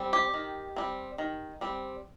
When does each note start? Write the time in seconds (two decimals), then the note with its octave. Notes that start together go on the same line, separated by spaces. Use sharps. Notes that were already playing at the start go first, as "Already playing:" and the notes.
Already playing: G3 C4
0.13 G4
0.34 D#3
0.76 G3 C4
1.18 D#3
1.61 G3 C4